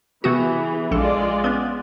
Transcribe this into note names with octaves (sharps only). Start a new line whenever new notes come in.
C3 E3 B3 F#4 G#4
A#1 G#3 F4 A4 D5
B3 C#4